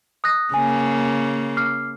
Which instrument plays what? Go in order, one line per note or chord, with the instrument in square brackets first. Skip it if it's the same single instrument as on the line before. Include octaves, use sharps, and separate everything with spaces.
[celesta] D#6 F#6 A#6
[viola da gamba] C#3 A#3 [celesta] G#5
[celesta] D6 F6 C7